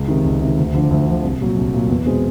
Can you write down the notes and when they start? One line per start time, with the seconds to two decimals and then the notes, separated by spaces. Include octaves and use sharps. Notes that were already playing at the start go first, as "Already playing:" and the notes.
Already playing: C#2
0.08 C3 D#3
0.24 C#2
0.41 C3 D#3
0.58 D2
0.75 D3 F3
0.91 D2
1.07 D3 F3
1.24 C2
1.41 A#2 F#3
1.57 C2
1.73 A#2 F#3
1.90 E2
2.06 B2 G#3 C4